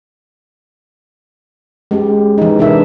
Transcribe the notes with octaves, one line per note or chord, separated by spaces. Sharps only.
G#3 C#4 G4
E3 D#4
C3 D4 D#4 A#4 B4 E5